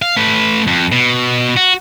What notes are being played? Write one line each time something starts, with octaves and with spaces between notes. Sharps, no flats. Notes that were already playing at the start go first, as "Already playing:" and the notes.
F5
A3 B4
F2
B2
F#4